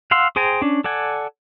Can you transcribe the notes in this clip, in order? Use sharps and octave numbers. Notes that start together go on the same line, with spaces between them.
F5 F#5 C6 E6
G#4 C5 G5 G#5 A#5
C#4 D4
A4 D5 F#5 G#5